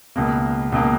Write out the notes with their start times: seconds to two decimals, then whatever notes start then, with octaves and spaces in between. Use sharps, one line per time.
0.16 C#2 B2 A#3
0.72 C#2 B2 A#3